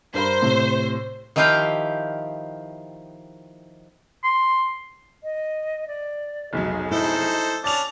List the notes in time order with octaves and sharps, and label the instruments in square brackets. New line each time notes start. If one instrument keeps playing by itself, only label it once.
[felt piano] G2 A#4 B5 [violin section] C5
[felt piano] A2 C3
[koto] D#3 F3 E4 G4 F5 G5
[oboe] C6
[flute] D#5
D5
[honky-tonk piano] F1 B1 F#3 [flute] G#4
[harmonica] D#4 A4 C5 [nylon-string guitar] E4
[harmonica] C#4 D4 A5 [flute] D6 [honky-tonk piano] A6 F7